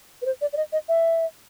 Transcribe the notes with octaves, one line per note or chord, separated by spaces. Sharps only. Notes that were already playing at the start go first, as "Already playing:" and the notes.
B4
C5
D5
D5
D#5
D#5
E5